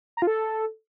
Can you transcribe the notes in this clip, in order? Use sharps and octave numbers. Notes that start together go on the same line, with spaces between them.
A#5
F4
A4